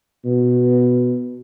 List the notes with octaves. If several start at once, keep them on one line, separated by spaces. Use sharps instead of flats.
B2